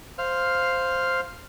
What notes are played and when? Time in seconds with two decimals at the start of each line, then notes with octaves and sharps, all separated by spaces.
0.18 C5 F5 F6